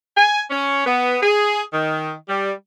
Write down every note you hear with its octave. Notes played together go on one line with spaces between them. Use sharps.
G#5
C#4
B3
G#4
D#3
G3